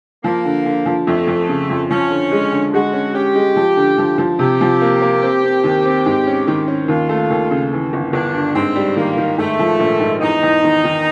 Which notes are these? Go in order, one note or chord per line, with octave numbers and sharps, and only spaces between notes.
F3 A#3
D3
D3
F3
F2 A3
F2
C#3
F2
F3 C#4
D3
G#3
D3
G#3 F#4
C#4
C#4 G4
G#3
F3
D3
F3
F3
C3 G4
F3
A#3
A#3
C4
C4
D#2
C4
G#2
C#4
D#3
C#4
D#2 F4
A3
D#2
C#3
E3
G1
G1 D4
G2
G#2 C4
G3
D#3 A#3
D#3
G#2 A3
F3
A#1
G#2
E2 D#4
E2
D#3
D#3